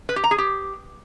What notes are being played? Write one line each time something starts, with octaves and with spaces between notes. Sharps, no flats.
B4
G4
A#5
G#4
G4